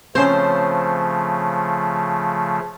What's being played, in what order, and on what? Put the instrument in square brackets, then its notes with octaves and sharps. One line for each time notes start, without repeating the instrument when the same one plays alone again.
[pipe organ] C#3 F3 A3 [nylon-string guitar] C4 C#4 [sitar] C5